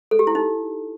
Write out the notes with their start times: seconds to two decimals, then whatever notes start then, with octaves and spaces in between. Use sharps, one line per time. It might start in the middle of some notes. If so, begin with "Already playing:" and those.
0.11 A4
0.19 G4
0.27 E4
0.35 D#4